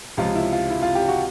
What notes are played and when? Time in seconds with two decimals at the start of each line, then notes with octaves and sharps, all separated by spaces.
0.17 C#2 C3 F3 F4
0.35 E4
0.53 F4
0.70 E4
0.83 F4
0.95 G4
1.08 F#4